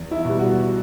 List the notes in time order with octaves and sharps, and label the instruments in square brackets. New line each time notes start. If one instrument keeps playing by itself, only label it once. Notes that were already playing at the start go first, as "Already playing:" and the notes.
Already playing: [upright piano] E2
E4
B2 G3
F#4